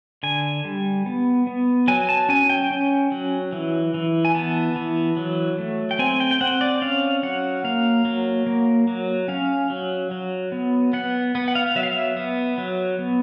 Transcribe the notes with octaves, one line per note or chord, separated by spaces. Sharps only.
D3 G#5
G3
B3
B3
F#3 G#5
A5
C#4 G#5
G5
C#4
F#3
E3
E3
G#5
B3 A5
E3
F#3
A3
G5
C4 G#5
G5
G5
C4 F#5
D5
C#4 F5
F#3 F#5
A#3 F5
F#3
A#3
F#3
C#4 F5
F#3
F#3
B3
B3 F#5
B3
F#5
F5
F#3 E5
F5
E5
B3
F#3
B3